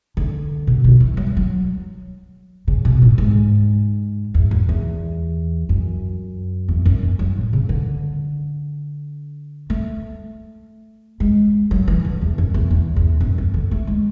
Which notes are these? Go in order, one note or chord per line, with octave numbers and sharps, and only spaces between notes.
D3
B2
D3
E3
F#3
E3
F#3
C#3
B2
A2
G#2
E2
F#2
E2
F#2
E2
F#2
E3
F#3
A2
C#3
D3
A3
G#3
F#3
E3
D3
E2
F#2
E2
E2
E2
F#2
E3
D3
A3
G#3